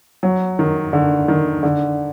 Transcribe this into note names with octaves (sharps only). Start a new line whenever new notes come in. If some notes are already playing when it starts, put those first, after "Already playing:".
F#3
D#3
D3
D#3
D3